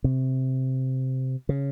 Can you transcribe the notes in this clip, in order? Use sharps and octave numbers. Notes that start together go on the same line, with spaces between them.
C3
C#3